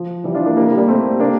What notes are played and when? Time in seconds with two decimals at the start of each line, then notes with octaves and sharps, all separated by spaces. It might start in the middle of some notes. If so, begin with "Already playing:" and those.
Already playing: F3
0.24 E3 G3
0.34 D4 F4
0.46 A#3 D4
0.56 G3 A#3
0.66 G3 A#3
0.77 G3 A#3
0.88 A3 C4
1.20 A#3 D4